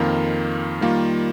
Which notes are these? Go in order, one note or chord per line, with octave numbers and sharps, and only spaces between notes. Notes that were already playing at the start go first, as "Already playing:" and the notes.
Already playing: F2 D#3 A#3 F4 A#4
D#3 G3 A#3 F4